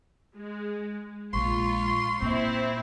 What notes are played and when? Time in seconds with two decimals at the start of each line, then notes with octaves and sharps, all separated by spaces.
0.36 G#3
1.33 A#1 G#3 F4 C6 C#6
2.22 A#2 C4 E4